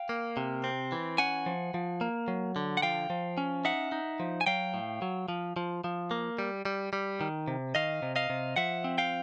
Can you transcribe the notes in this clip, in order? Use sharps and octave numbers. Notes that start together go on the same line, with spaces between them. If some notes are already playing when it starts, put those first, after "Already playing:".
Already playing: F5 G5
A#3
C3
C4
E3
C#4 F#5 G#5
F3
F3
A#3
F#3
D3
F#5
F3 F5 G5
F3
C#4
D#4 E5 F#5
D#4
F3
G#5
F#3 F5 G5
A2
F#3
F3
F3
F3
A#3
G3
G3
G3
D#3
C3
D#3 D#5 F5
C3
D#5 F5
C3
F3 E5 F#5
C4
F5 G5